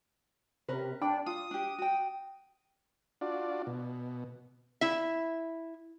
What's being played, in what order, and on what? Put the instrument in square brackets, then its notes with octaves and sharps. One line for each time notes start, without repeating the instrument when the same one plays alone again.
[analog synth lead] C3 [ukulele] C#4 A#4 B4
[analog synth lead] D4 [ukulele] G5 B5
[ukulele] F4 [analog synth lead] D#6
[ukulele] D4 G4
F#4 G5
[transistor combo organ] D4 F4 F#4 D5
B2
[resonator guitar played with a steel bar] E4 E5